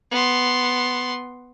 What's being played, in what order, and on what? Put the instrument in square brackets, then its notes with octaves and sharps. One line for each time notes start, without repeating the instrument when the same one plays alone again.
[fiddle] B3 C6